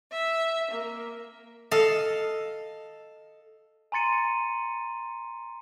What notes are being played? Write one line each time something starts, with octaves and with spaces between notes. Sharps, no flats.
E5
A#3
A4 D#5 F5
G#5 A#5 C6 A6 C#7 D#7